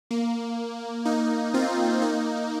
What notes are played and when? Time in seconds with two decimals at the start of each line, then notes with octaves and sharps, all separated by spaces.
0.11 A#3
1.05 A#3 D#4
1.54 C4 F4
2.02 A#3 D#4